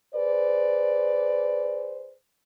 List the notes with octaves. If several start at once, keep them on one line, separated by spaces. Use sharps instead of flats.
G#4 B4 C5 D5